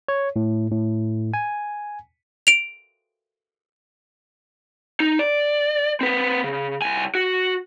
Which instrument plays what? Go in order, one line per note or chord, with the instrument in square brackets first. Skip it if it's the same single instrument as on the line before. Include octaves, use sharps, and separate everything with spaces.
[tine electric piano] C#5
A2
A2
G#5
[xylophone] D7 F7
[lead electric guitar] D#4
D5
C4 B4
C#3
C2 G#5
F#4